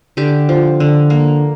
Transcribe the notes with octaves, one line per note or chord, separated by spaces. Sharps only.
D3 G4
F3
D3
A#3